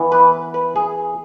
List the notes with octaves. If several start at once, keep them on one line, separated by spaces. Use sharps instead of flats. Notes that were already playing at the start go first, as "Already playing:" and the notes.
Already playing: E3 B3
B4
B4
G#4